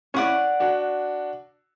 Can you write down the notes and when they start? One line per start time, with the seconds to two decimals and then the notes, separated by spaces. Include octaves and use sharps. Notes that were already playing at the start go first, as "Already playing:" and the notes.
0.14 C#4 E4 D5 F#5 C#6
0.60 D4 F#4